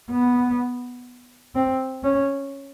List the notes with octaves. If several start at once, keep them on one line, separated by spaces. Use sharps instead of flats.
B3
C4
C#4